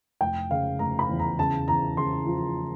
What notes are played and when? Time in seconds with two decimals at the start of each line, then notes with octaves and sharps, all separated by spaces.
0.21 F1 G5
0.51 C#3 F5
0.79 F1 A#5
0.99 B5
1.09 E2
1.19 A#5
1.39 C#3 A5
1.68 E2 A#5
1.97 C#3 C6
2.27 F3